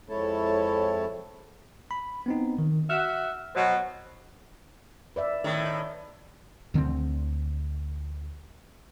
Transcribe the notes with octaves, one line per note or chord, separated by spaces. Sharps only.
F2 G#3 E4 A4 C#5 A5
B5
B3 C4 D#4
D#3
F#4 E5 F6
B2 F#3 C5
B4 D5 E5
A2 D#3
D2 D3 B3 C4